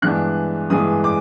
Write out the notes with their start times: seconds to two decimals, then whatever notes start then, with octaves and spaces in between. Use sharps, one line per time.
0.02 G2 E3 G#3 B3 D4 F#6
0.70 G2 E3 G#3 B3 D4 D#6
1.04 D6